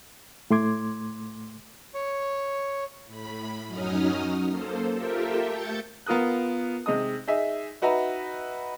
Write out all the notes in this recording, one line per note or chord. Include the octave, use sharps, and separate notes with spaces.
A2 A3 C6 D6 G#6
C#5
A2 B5
F#2 F#3 C#4 D#4 D#6 F6
A#3 A4 C5
F4 G4 A4 A#4 E5 G5
A3 G6 A6 C#7
B3 F4 A#4 D#6 F#6
C3 G#3 D#4 D#6
D#4 G#4 E5
D#4 F#4 B4 E5 A#5